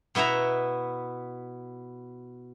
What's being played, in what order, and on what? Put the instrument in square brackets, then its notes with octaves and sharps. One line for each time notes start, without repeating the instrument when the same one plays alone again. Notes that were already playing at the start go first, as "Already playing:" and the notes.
[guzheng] B2 B3 E4 E5 A#5